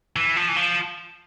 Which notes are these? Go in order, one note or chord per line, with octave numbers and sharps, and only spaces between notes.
E3
F3
E3
F3